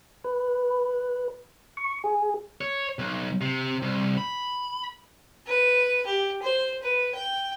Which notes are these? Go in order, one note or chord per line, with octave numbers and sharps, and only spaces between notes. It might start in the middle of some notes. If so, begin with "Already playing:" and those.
B4
C#6
G#4
C#5
B1
C3
C2
B5
B4
G4
C5
B4
G5